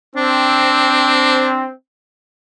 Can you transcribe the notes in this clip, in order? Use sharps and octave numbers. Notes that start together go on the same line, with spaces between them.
C4 D4